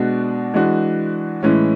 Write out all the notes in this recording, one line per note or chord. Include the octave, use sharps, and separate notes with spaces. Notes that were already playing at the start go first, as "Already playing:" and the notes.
Already playing: B2 G#3 D4 F#4
E3 G#3 D4 F#4
A2 E3 G#3 C#4